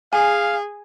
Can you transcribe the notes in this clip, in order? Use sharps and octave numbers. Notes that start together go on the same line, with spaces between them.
G#4 F5 G#5